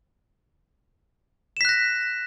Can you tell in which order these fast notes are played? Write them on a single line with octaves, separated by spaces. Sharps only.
E7 B6 F#6 A#6